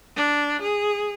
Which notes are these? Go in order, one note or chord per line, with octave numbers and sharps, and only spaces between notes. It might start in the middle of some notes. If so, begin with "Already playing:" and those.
D4
G#4